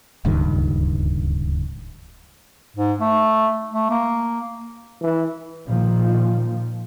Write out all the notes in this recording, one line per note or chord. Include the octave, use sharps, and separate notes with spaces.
D1 C#2 G2 D#3
G#2
A3
A3
A#3
E3
A#2 D#3 F3